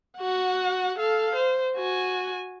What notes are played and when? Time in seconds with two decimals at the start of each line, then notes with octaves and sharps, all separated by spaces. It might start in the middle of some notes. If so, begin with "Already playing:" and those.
0.18 F#4 F#5
0.98 A4 F5
1.35 C5
1.76 F#4 G#5